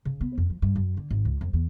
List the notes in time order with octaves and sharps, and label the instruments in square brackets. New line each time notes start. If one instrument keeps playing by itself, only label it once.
[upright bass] C#3
B3
F2
F3
G2
F#2
D3
G#1
C#2
F2
E2